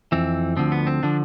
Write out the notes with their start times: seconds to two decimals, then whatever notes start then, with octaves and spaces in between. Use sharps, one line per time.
0.12 F2 E3 C4
0.57 D2 D3 F3 C4
0.72 B3
0.87 C4
1.03 D3 F3 D4